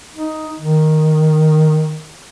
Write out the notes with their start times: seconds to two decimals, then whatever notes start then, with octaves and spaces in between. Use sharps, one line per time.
0.14 D#4
0.59 D#3